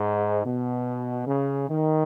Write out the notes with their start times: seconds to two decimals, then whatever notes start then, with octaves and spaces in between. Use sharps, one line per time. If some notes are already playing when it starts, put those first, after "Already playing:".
Already playing: G#2
0.44 B2
1.27 C#3
1.68 D#3